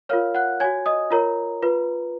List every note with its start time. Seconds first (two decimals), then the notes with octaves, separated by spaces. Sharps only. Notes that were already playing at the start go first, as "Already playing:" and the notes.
0.09 F4 A#4 C#5 F5 F6
0.35 F#5 F#6
0.60 F#4 C#5 G#5 G#6
0.86 D#5 D#6
1.11 F4 A#4 C#5 A#5
1.62 F4 B4